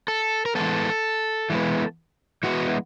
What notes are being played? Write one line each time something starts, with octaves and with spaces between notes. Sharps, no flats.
A4
A#4
E3 G#3 B3 A4
E3 G#3 B3
E3 G#3 B3 F#4